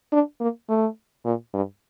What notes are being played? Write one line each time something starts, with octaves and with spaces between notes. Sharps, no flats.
D4
A#3
A3
A#2
G2